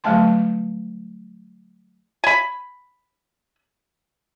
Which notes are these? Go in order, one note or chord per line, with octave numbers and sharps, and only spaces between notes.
D3 F#3 G3 A3 A5 C6
G#5 B5